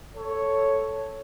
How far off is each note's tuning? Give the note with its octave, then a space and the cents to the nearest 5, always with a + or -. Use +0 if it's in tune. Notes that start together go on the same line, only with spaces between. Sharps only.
A4 +0 C#5 +0